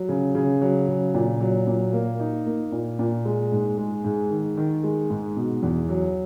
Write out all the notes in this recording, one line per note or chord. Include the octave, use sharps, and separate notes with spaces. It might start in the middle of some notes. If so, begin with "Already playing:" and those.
Already playing: F#3
C#3
C#3
F#3
C#3
A#2
F#3
A#2
A#3
D#4
A#3
A#2
A#2
G#3
G#2
G#3
G#2
D#3
D#3
G#3
G#2
B2
E2
F#3